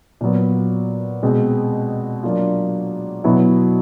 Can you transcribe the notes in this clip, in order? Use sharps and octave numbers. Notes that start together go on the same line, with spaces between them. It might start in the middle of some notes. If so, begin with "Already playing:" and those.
A#2 F#3 B3
B2 G#3 C4
F#3 A#3 D4 F4
B2 F#3 B3 E4